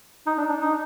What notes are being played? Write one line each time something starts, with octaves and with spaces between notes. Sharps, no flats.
D#4
D4
D4
D#4